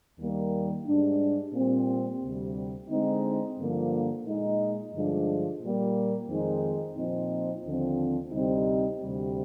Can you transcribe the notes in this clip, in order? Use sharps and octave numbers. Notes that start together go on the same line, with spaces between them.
D#2 D#3 G3 A#3
G#2 G3 D4
A#2 G3 C4
D2 C3 G3
D3 G#3 C4 D#4
G2 D3 F3 A#3
A#2 G#3 D#4
G2 D3 F3 G#3 D4
A#2 G3 A#3
F2 D#3 G#3 C4 D#4
A#2 F3 C4 D#4
D#2 D3 F3 C4
D2 C3 G3 C4 D#4
D2 C3 G3